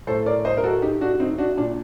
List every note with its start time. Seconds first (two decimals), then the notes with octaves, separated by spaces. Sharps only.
0.07 A2 A4 C5
0.26 A#4 D5
0.45 C5 D#5
0.57 A#4
0.64 F#4 A4
0.82 D#4 G4
1.01 D4 F#4
1.20 C4 D#4
1.38 D4 F#4
1.57 A#2 D4